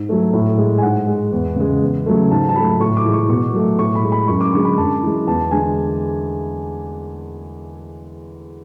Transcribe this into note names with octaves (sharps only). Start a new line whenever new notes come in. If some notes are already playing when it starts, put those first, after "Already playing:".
Already playing: G#2
F#3 A3
A2
G#3
G#5
G#2 F#5
G#3
E2
C#3 G#3
E2
C#3 F#3 A3
G#2 A5
A5
F#3 A3 B5
A2 C#6
D6
E3 G#3
C#6
B2 C#6
F#3 A3
A2 C#6
B5
G#3
B5
F#2 C#6
D6
D3 G#3 C#6
B5
F#2 A5
E3 G#3
E2 A5
D3 G#3 G#5